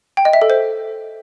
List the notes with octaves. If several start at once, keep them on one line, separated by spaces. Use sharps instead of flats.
G5
D#5
E5
A4
C5